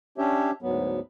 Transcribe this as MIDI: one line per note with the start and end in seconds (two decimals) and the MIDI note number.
0.18 0.51 61
0.18 0.51 62
0.18 0.51 67
0.18 0.51 73
0.18 0.51 76
0.62 1.00 38
0.62 1.00 44
0.62 1.00 54
0.62 1.00 59